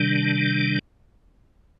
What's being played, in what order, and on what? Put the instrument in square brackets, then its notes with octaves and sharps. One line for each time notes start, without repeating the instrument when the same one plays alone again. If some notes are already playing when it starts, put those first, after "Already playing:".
Already playing: [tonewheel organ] C3 D#3 G3 D4